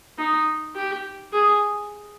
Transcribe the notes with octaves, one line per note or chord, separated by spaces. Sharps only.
D#4
G4
G#4